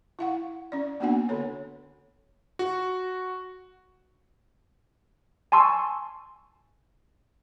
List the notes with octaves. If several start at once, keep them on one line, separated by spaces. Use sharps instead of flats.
E4 F5 F#5
C#4 D5
A#3 B3 D4 F#4 F#5 G#5
D3 A4 C#5
F#4
G#5 A5 C6 C#6 E6